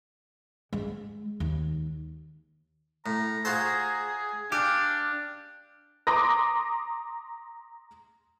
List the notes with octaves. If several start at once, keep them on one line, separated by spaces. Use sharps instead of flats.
G#3
D#2
A2 A#5
F4 F#4 G#4 C5
D4 G4 F5 G#5
A#5 C6 D6 D#6 A#6